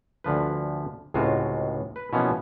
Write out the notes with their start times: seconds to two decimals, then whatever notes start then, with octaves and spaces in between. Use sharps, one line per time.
0.24 D2 D3 F3 B4
1.14 C#2 A2 C3 G#3 F4 F#4
1.96 B4
2.13 B2 E3 F3 A#3 B3 C#4